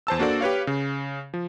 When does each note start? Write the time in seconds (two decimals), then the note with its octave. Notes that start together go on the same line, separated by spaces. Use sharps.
0.07 E2 C5 A5 E6
0.19 A#3 D4 F#4 A4 C5 D5
0.41 G4 B4 C#5 F5
0.67 C#3
1.34 F3